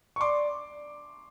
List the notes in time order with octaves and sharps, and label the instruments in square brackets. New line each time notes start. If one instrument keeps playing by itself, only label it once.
[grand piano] C#6
[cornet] D5 [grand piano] C6 D6